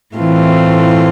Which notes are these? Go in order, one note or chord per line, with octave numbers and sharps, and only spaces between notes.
A2 E3 A3 C4 F4